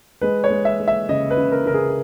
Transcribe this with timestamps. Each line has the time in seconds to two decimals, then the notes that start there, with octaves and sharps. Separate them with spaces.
0.21 G#3 B4
0.44 C#5
0.51 G#3
0.65 E5
0.80 G#3
0.88 E5
1.09 C#3 D#5
1.31 B4
1.37 C#3
1.52 A#4
1.66 C#3 A#4
1.74 G#4